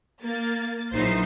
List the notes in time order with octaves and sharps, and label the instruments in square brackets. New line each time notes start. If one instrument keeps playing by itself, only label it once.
[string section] A#3 A6
A#1 E3 F#3 D#4 C5 C7